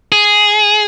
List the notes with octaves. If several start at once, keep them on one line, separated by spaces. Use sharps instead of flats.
G#4